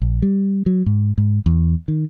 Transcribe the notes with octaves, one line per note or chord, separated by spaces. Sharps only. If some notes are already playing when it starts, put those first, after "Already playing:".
A#1
G3
F#3
G#2
G#2
E2
D#3